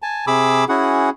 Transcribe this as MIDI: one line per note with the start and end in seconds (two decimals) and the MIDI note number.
0.02 0.25 80
0.02 0.25 81
0.27 0.64 48
0.27 0.64 68
0.27 0.64 83
0.27 0.64 86
0.27 0.64 88
0.69 1.10 61
0.69 1.10 64
0.69 1.10 66
0.69 1.10 68
0.69 1.10 78